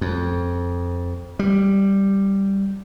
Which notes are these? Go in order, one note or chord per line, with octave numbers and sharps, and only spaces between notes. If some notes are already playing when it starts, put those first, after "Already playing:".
F2
G3